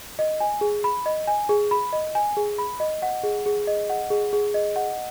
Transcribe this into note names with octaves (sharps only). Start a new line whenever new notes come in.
D#5
G#5
G#4
B5
D#5
G#5
G#4
B5
D#5
G#5
G#4
B5
D#5
F#5
G#4
G#4
D#5
F#5
G#4
G#4
D#5
F#5